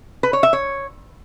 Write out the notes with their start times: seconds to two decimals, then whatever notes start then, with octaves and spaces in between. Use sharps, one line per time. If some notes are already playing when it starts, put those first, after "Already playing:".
0.23 B4
0.33 C#5
0.43 E5
0.53 C#5